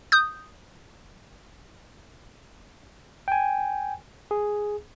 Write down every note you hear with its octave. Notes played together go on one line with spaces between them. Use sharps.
D#6 G6
G5 G#5
G#4